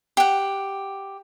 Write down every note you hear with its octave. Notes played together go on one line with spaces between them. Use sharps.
G4 F#5